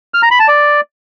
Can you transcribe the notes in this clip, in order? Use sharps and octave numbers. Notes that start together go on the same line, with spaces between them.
F6
A#5
B5
A5
D5